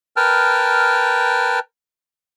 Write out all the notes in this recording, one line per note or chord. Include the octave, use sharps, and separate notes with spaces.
A#4 B4 G5 A5 F6